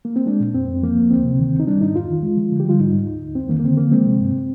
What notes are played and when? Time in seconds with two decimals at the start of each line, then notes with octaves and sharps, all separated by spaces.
0.05 A#3
0.16 C4
0.26 G#3 D4
0.40 A#2
0.54 F2 C4
0.68 F2
0.83 F3 A#3
0.97 D#2
1.11 D2 C4
1.24 C3
1.39 D#3
1.54 D2
1.60 D#4
1.67 G3 D4
1.81 G#2 D#4
1.95 F2 F4
2.09 D#3
2.23 G#3
2.37 F3
2.52 D3
2.60 G4
2.65 G3 F4
2.79 G#2 D#4
2.93 G#2
3.08 D2
3.22 D2
3.35 F2 C4
3.49 D#3 A#3
3.60 A#3
3.63 D3 C4
3.78 F3 A#3
3.91 G#3 C4
4.05 C3
4.20 G2